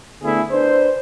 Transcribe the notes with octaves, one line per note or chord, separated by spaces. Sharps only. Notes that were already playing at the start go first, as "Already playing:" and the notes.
D3 A3 B3 E4 G#4
D4 B4 C5